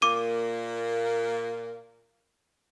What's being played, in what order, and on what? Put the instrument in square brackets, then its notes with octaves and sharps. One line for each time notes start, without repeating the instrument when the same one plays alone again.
[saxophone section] A#2 A#3 [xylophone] D6 D#7